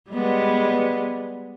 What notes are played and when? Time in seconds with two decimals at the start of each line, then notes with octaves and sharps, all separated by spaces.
0.10 G3 G#3 B3